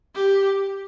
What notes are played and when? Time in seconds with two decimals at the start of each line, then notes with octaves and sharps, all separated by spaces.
0.15 G4